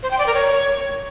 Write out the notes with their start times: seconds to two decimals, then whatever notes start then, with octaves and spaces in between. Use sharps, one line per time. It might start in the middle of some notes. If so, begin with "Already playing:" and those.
0.03 C5
0.11 G5
0.19 D5
0.26 A#4
0.34 C#5